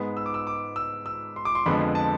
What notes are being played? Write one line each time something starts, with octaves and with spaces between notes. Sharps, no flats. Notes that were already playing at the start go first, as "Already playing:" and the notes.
Already playing: G#2 G#3 B3
E6
D6
E6
D6
E6
E6
C6
D6
C6
F2 D3 F3 G#3 B3 B5
A5